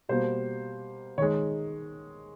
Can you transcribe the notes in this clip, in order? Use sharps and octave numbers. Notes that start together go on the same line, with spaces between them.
B2 G3 A#3 C5
D#3 G#3 C#5